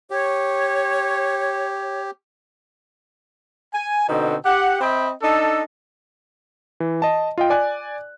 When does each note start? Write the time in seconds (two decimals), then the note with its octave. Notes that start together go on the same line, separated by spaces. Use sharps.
0.10 G4 C#5
3.74 G#5
4.08 B2 D3 C4 D#4
4.46 G4 F#5
4.81 C4 D#5 E5 G5 B5
5.22 D4 D#4 A4
6.80 E3
7.02 D#5 A5
7.38 F4 D#5 G5
7.50 D5 G#5 F#6